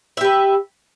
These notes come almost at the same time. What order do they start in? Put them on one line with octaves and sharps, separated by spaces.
E5 G4 B4